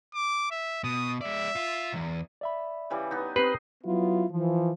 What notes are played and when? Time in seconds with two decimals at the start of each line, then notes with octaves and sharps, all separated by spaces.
0.15 D6
0.51 E5
0.84 B2 D#6
1.21 G#3 D5 E5
1.56 F4
1.92 B1 E2
2.41 D5 E5 B5
2.90 C#3 E3 G3
3.11 B3 D#4
3.36 C4 G4 B4 D#5 C6
3.84 F#3 B3 E4 F4
4.30 E3 F3